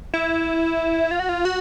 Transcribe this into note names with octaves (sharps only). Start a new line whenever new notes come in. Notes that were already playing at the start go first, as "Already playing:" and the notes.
E4
F4
F#4
F4
F#4